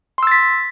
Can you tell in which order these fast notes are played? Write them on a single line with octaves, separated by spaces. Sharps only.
C6 E6 A6 B6